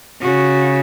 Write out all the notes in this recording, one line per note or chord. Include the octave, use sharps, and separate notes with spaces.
C#3 F#4